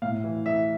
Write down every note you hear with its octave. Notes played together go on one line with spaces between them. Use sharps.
A2 F5
E3
E3 E5